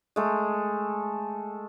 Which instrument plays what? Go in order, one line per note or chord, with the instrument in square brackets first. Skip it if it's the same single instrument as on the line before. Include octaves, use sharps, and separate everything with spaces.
[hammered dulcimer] G#3 A3